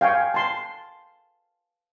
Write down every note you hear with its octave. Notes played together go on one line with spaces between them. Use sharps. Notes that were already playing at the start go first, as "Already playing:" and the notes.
F5 G5 G#5 C#6
A5 C6